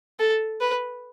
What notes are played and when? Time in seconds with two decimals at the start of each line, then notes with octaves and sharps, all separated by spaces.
0.19 A4
0.60 B4